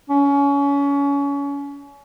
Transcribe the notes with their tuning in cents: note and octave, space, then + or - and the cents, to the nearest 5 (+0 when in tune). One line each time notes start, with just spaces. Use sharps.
C#4 +30